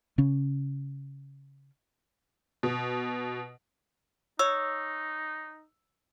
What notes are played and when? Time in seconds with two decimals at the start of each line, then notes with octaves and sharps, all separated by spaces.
0.18 C#3 C#4
2.63 B2
4.39 D#4 C#5 E6